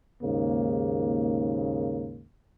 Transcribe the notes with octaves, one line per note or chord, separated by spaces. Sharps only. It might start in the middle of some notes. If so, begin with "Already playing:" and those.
D#2 G#2 C#3 A#3